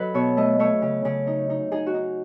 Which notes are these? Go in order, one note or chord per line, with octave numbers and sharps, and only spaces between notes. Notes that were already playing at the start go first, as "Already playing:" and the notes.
Already playing: F#3 F#4 A4 B4 D#5
B2 C#5
A3 D#5
A3 C#5
C#3
C#3
D#4
D#4
D#4 G#4
F#4
D#4